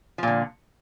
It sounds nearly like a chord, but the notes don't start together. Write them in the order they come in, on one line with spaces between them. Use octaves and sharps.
F3 A#2 D3